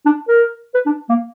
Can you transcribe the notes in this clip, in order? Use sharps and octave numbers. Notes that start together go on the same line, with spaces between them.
D4
A#4
B4
D4
A#3